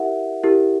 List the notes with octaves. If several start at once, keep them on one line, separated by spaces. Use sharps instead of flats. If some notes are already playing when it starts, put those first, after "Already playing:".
Already playing: E4 G4 A#4 E5 F#5
E4 G4 A#4